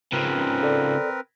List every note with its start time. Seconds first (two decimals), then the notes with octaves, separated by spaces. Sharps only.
0.12 C#3 F3 C4 A#4 B4
0.63 A4 D5